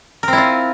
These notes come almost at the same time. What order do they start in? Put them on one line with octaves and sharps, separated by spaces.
A#4 C4 E4 F4